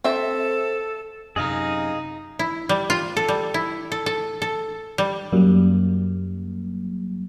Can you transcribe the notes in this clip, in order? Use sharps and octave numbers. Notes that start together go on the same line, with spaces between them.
C4 A4 E5
F#2 C3 D#4 G#4 D#5 F5
E4
G3
F4
A4
G3
E4
A4
A4
A4
G3
F#2 F#3 G3 A#3